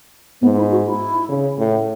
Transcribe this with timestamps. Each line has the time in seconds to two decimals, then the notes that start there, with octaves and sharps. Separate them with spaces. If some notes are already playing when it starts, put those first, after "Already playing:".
0.41 G#2 B3
0.56 E4
0.71 F#4
0.86 E4
1.29 C#3
1.59 A2